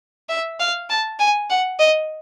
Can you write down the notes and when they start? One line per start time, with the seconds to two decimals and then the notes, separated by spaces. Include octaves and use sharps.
0.29 E5
0.60 F5
0.90 A5
1.19 G#5
1.50 F#5
1.79 D#5